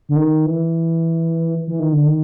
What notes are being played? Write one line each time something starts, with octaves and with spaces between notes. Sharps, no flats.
D3
D#3
E3
E3
D#3
D3
D#3